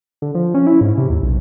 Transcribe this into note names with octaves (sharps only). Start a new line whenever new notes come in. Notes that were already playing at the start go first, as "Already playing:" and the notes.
D3
F3
C#4
E4
G#2
C3
D#2
B1